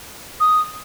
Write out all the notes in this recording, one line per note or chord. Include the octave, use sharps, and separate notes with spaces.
D#6